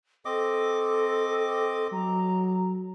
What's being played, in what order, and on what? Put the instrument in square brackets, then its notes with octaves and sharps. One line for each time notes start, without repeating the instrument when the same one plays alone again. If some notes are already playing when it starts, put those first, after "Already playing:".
[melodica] C4 D#5 D6 [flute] A4
[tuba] F#3 [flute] A#5